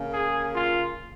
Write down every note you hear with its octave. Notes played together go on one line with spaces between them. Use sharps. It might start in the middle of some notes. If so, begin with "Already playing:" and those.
Already playing: C#3 A#3
G#4
F4